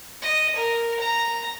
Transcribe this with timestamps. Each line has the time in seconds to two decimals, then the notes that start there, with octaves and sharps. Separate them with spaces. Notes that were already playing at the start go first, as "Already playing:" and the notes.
0.22 D#5
0.55 A#4
0.99 A#5